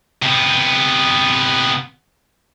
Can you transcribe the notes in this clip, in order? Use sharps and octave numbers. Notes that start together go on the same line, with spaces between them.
C3 B3